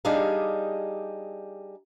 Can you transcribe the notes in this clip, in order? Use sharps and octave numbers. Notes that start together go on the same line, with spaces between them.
G3 D4 D#4 G4 G#4 F5